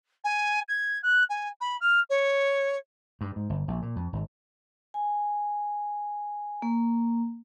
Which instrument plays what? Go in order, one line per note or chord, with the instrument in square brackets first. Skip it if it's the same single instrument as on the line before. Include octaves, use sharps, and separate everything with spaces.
[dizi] G#5
G#6
F#6
G#5
B5
F6
C#5
[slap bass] G2
G#2
G1
A#1
A#2
F2
G#1
[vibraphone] G#5
A#3